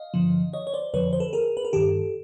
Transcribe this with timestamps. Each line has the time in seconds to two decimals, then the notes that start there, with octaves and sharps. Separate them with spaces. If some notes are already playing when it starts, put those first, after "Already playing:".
Already playing: D#5 F5
0.14 G2 D3 F3
0.53 C#5 D#5
0.67 C#5
0.74 C5 D5
0.94 F2 D3 F3 B4 C#5
1.13 C5
1.20 A4 B4
1.33 G#4 A#4
1.57 B4
1.65 A#4
1.73 G2 D#3 G4 A4